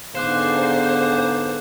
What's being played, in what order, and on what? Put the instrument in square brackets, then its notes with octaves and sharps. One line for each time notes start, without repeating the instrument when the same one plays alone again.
[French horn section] G#2 D3 B3 [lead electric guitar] C5 [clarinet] F5 [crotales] D6 F#6 E7